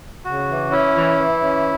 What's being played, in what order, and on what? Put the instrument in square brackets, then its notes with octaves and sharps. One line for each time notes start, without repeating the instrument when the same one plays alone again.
[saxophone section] C#3 [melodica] F#4
[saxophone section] E3
[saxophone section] C#4 [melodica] E4
[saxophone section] E3
E3
C#4